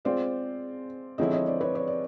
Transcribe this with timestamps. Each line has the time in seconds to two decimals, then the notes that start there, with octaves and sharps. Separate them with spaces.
0.05 G#3 C4 F4 C5 D5
1.18 D3 F3 G#3 C4 E4 C#5 D#5
1.33 C#5 D#5
1.47 C5 D5
1.61 B4 C#5
1.75 C#5
1.88 D5